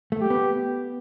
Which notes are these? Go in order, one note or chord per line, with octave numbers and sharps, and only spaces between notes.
A3
G4
B3